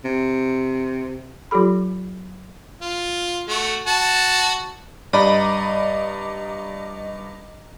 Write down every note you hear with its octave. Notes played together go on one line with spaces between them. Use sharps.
C3
F#3 F4 G4 A4 B5
F4
A3 F#4
F#4 A5
G2 D5 D#5 A#5 B5 D6